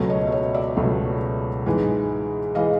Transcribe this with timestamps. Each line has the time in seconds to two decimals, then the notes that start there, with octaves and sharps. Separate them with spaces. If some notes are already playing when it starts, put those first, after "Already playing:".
Already playing: C#2 B2 F#3 A3
0.10 C#5 D#5
0.27 E5
0.32 C#5 D#5
0.54 D5 E5
0.76 C#2 B2 F#3 A3
1.66 G#2 E3 G#3
2.55 E3 G#3 D#5 F5